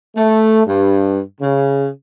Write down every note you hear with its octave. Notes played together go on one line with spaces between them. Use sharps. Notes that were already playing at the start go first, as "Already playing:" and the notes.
A3
G2
C#3